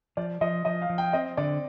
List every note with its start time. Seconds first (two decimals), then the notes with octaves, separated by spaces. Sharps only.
0.17 F3 D5
0.41 F3 D#5
0.65 F3 D#5
0.82 F5
0.90 F3
0.98 G5
1.13 C4 D#5
1.37 D3 D5